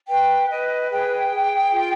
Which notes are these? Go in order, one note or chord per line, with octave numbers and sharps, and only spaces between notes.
B4 G5
B4 D#5
G#4 G5
G#4
F4